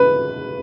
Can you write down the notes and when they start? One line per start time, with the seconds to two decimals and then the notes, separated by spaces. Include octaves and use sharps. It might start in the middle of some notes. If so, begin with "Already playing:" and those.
Already playing: B4